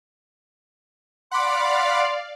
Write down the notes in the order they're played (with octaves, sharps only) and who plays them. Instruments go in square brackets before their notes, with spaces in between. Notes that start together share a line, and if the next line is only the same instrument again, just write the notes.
[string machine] D5 F5 [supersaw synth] F#5 B5 D6 [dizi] C6